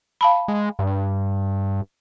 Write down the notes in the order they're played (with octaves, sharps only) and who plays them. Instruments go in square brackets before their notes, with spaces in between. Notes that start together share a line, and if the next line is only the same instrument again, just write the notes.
[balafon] F5 A5 B5
[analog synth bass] G#3
G2